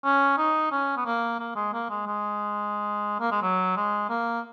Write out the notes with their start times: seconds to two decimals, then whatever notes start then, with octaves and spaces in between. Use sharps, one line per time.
0.04 C#4
0.38 D#4
0.71 C#4
0.97 B3
1.05 A#3
1.40 A#3
1.56 G#3
1.73 A#3
1.90 G#3
2.06 G#3
3.20 A#3
3.31 G#3
3.42 F#3
3.77 G#3
4.10 A#3